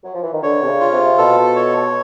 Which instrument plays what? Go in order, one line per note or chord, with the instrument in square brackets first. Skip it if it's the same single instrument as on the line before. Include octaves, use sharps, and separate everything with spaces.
[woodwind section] F#3
F3
E3
D#3
[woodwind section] D3 [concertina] C#5
[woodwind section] C3
C#3
[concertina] F4
[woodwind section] C3
[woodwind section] B2 [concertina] A4
[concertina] C#5